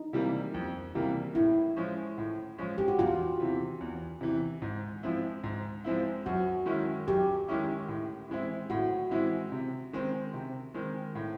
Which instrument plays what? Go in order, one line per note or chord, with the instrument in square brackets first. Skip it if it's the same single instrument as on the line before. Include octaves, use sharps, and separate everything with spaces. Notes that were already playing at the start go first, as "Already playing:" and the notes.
Already playing: [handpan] D#4
[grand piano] C3 E3 G3 A#3
F2
C3 E3 G3 A#3
[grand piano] A2 [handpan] E4
[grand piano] F3 G#3 C#4
A2
F3 G#3 C#4
[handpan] G4
F#4
[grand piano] E2 [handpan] F4
[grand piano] C3 E3
E2
C3 E3
G#2
F3 G#3 C4 E4
G#2
F3 G#3 C4 E4
[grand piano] F#2 [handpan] F#4
[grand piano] D#3 G#3 C#4 E4
[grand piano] F#2 [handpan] G4
[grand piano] D#3 G#3 C#4 E4
A2
E3 G#3 C4 E4
[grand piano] A2 [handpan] F#4
[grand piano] E3 G#3 C4 E4
C3
D#3 G#3 C4
C3
D#3 G#3 C4
A2